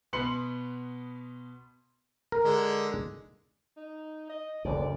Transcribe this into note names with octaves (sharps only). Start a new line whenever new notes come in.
B2 B3 B5 C6 C#7 F#7
A#4
D3 G#3
D#4
D#5
F#1 D2 D5